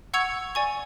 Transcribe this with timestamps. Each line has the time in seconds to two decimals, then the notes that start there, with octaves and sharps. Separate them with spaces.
0.14 F#5 C#6 E6 G#6 C#7 F7
0.55 D5 G#5 C#6